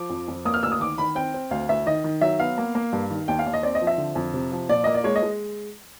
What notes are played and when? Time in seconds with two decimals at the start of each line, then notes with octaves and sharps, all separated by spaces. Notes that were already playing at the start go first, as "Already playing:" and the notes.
Already playing: F3 D6
0.10 F2
0.28 F2
0.45 A#3 D#6
0.54 F6
0.63 D2 E6
0.72 D#6
0.80 D#3 D6
0.98 D#3 B5
1.15 C4 G5
1.34 C4
1.51 D2 F5
1.69 D2 E5
1.86 D#3 D#5
2.04 D#3
2.21 F#3 E5
2.39 B3 F5
2.58 A#3
2.75 A#3
2.93 G2
3.10 D#3
3.28 D#2 G5
3.39 F5
3.46 D#2
3.53 D#5
3.63 C4 D5
3.75 D#5
3.81 F3
3.87 E5
3.98 D3
4.15 F2
4.34 C3
4.52 F3
4.69 A#2 D5
4.84 A#3 D#5
4.94 D5
5.04 G#3 C#5
5.16 D#5
5.23 G#3